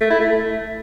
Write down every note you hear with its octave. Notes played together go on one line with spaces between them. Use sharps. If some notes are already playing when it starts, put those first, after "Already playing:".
A3
E4
A3